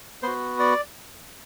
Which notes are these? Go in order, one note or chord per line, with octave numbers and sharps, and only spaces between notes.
B3 F#4 C5
D5